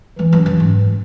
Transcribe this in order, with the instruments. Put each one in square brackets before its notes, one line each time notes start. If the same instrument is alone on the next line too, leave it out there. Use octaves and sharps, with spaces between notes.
[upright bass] E2 [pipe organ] E3
[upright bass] F#2
F#2
G#2